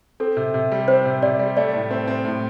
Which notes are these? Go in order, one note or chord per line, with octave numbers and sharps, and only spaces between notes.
C4 A4
C3
C3
G3
C4 C5
C3
C3 D5
G3
A3 D5
A2
C4
C4
A2